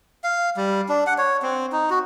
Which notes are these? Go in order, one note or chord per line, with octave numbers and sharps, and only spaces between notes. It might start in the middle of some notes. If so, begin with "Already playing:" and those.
F5
G3
D4
F#5
C#5
C4
D#4
F#4